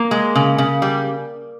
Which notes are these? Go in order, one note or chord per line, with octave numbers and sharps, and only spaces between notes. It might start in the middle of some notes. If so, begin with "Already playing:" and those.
Already playing: A#3
G#3
C#3
C#3
G3